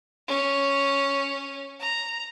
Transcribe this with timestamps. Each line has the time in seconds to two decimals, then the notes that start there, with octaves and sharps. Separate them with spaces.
0.28 C#4
1.80 A#5